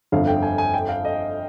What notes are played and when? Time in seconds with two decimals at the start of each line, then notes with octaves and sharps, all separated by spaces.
0.12 G1 F2 D3 F5
0.27 G5
0.43 G#5
0.58 G#5
0.74 G5
0.89 F5
1.05 D#5